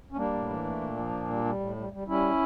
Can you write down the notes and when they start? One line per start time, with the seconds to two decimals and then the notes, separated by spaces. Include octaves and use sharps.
0.12 C#4
0.17 G3 A#3 D4
0.33 A2
0.50 E3
0.65 A3
0.81 A#2
0.96 F3
1.13 A#2
1.28 G3
1.45 G3
1.60 A2
1.76 G3
1.92 G3
2.08 G3 C#4 E4